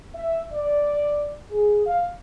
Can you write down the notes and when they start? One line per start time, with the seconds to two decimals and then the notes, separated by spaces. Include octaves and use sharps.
0.15 E5
0.53 D5
1.51 G#4
1.86 F5